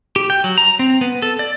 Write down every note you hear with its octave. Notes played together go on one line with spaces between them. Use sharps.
G4
G5
F#3
A#5
C4
B3
A4
D5